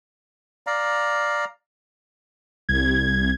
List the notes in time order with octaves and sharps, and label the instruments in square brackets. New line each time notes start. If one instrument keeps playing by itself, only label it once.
[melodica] D5 F5 A#5
[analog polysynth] C2 G#6